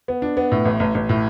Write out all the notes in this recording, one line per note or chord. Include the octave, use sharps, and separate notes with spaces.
B3
D4
B3
A2
A1
A1
A1
A2